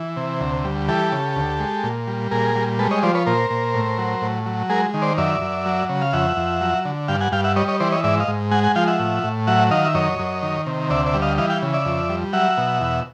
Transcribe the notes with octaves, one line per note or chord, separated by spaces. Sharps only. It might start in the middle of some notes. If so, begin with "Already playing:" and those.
Already playing: E3
C3
D2
G3
E3 G4 A4
C#3
D2
G#3
A#2
G3
A#2 G#4 A#4
G3
G#3 A4 B4
C#5 D#5
F3 C5 D5
B4 C#5
A#2 A#4 C5
A#2
A2
F#3
A2
F#3
G#3 G#4 A#4
D#3
C5 D5
F#2 D5 E5
F#2
F#3
C#3
F5
F2 E5 F#5
F2
F#3
D3
G2 F5 G5
F#5 G#5
G2 F5 G5
E5 F#5
G3 C#5 D#5
C#5 D#5
E3 C5 D5
C#5 D#5
G#2 D5 E5
D#5 F5
G#2
G#3 F#5 G#5
F#5 G#5
F3 F5 G5
E5 F#5
A2
A2
F#3 E5 F#5
D#3 D#5 F5
E5
F#2 C#5 D#5
F#2
D#3
C3
D2 D5 E5
D5 E5
G3
D#5 F5
E3 D#5 F5
F5 G5
C#3
D5 E5
F2
G3
F#3 E5 F#5
B2
E2